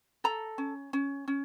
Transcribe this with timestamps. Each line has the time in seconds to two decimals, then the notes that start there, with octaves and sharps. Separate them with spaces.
0.24 A4 A#5
0.58 C#4
0.93 C#4
1.28 C#4